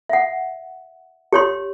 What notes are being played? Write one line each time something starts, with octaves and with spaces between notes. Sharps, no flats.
E5 F#5
G4 C#5 C6